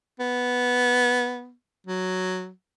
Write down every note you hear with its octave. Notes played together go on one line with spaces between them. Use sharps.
B3
F#3